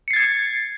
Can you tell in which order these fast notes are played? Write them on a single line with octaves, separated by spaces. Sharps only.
C#7 C7 A6 G#6